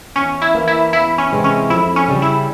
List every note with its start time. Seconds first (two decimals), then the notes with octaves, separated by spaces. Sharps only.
0.16 E2 C#4
0.42 E4
0.54 E3 A#3
0.68 E4
0.93 E2 E4
1.18 C#4
1.32 C3 E3 G#3 C4
1.44 C#4
1.70 F2 E4
1.96 C#4
2.08 C#3 G3
2.22 E4